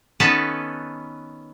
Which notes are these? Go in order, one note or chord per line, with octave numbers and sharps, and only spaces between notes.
D#3 B3 C#4 A4 B4 A5